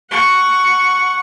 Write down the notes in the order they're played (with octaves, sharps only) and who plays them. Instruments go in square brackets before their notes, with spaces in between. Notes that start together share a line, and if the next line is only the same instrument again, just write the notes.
[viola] F#5 C#6